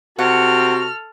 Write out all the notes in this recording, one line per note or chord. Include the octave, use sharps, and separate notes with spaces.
C3 F#4 A4 F#5 F6